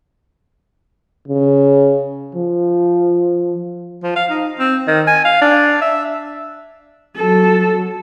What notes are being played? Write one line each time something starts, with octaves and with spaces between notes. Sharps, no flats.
C#3
F3
F3
F5
D#4
C4
D#3
G#5
F5
D4
E5
F#3 A4